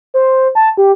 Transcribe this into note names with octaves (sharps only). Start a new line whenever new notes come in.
C5
A5
G4